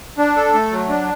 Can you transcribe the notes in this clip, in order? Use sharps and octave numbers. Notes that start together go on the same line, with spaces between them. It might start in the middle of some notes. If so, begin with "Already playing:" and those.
D4
A4
A3
F#3
D4